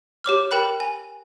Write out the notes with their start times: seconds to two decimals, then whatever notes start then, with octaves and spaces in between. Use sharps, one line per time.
0.24 G4 C#5 D6 F6
0.51 G4 A#4 G5 B5 F#6
0.80 G#5